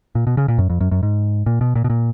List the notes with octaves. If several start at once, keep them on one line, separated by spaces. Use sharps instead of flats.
A#2
B2
C#3
A#2
F#2
F2
F#2
F#2
G#2
A#2
B2
A#2
B2
A#2